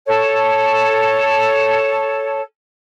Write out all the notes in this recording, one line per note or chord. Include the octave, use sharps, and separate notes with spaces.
A4 C#5